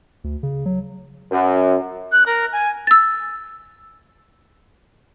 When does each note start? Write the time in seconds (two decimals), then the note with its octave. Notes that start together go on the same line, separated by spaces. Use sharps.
0.24 D2
0.43 C#3
0.66 F#3
1.31 F#2
2.11 F#6
2.26 A#4
2.52 G#5
2.87 E6 A6